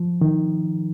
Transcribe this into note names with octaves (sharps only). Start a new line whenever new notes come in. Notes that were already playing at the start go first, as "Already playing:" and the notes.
Already playing: F3
D#3